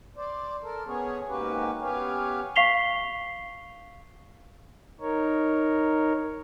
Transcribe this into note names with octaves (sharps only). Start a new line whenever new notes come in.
C5 D5
A4 A#4
B3 C#4 G#4 C#5
G#2 A#3 C#4 F#4 G4 B4
B3 C#4 G4 B4 C#5 F5
F5 C#6 B6 C7 F7 G7
D#4 A#4 C#5